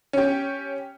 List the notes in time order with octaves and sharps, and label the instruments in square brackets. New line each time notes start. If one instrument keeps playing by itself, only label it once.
[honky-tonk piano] C#4 G4